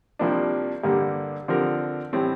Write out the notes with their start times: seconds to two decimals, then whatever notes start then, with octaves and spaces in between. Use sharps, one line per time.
0.19 C2 C3 F3 A#3 D4
0.83 G2 D3 G3 A#3
1.48 D3 F3 C4 G4 A#4
2.13 A2 E3 G3 C4